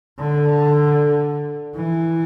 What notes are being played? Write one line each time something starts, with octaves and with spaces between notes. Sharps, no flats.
D3
E3